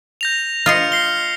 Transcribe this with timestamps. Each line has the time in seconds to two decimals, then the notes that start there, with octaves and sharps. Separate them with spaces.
0.21 G6 A#6 F7
0.66 F4 D#5 C6 F6 C#7
0.92 C7 G7